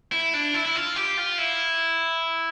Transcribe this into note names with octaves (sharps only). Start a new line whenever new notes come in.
E4
D4
E4
E4
F4
G4
F4
E4